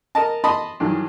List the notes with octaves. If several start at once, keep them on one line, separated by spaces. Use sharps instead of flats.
A#4 D#5 A5
D#5 A5 B5 C6 D#6
G2 D#3 E3 F#3